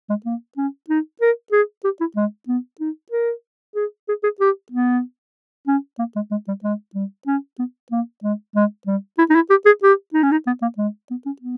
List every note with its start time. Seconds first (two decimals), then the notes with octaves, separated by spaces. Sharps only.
0.09 G#3
0.25 A#3
0.57 C#4
0.89 D#4
1.21 A#4
1.52 G#4
1.84 G4
2.00 E4
2.16 G#3
2.48 B3
2.80 D#4
3.11 A#4
3.75 G#4
4.08 G#4
4.24 G#4
4.40 G4
4.72 B3
5.67 C#4
5.99 A#3
6.16 G#3
6.31 G#3
6.48 G3
6.64 G#3
6.95 G3
7.27 C#4
7.59 B3
7.91 A#3
8.23 G#3
8.55 G#3
8.87 G3
9.18 E4
9.30 D#4
9.35 E4
9.50 G4
9.66 G#4
9.83 G4
10.14 D#4
10.23 C#4
10.32 D#4
10.47 B3
10.62 A#3
10.78 G#3
11.10 B3
11.26 C#4
11.41 B3